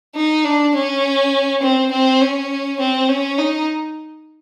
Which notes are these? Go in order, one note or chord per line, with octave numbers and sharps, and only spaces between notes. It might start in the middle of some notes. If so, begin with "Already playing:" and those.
D#4
D4
C#4
C4
C4
C#4
C4
C#4
D#4